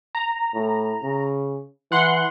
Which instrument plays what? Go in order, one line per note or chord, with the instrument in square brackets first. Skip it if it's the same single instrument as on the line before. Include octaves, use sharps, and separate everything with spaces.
[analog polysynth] A#5
[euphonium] A2
C#3
[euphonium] E3 [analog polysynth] F#5 C6 F#6